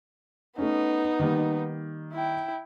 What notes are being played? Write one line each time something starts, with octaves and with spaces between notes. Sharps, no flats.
A3 B3 C#4 D#4
D#3 G3 A#3
E4 G5